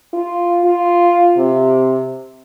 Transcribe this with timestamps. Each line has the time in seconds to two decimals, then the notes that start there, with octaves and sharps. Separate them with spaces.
0.13 F4
0.64 F4
1.38 C3